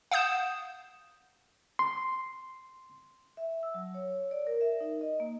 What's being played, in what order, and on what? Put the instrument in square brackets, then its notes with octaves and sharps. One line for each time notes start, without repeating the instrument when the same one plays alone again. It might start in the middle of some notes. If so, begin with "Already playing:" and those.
[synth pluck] F5 F#5 D#6 G6 E7
[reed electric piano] C6
[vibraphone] E5
E6
F#3
C#5
D5
A#4
E5
D#4
D#5
A#3